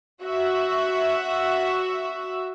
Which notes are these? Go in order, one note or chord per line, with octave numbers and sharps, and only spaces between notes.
F#4 E5